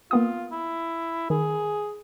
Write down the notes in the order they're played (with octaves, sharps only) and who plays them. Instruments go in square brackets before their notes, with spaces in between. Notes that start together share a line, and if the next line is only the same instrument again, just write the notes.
[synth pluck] A#3 B3 D#6 [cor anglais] F4
[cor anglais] E4
[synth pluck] D#3 [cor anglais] G#4